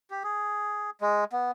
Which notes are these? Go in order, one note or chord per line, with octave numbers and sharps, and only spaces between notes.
G4
G#4
G#3
B3